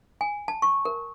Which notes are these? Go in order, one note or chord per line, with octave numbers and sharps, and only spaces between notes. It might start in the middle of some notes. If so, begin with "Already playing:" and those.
G#5
A5
C#6
A#4